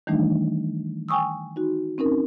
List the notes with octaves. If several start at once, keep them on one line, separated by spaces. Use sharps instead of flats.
D#3 E3 G3 A3 D4 D#4
G5 G#5 C#6 D#6 E6
D#4 F#4
C4 C#4 D#4 A#4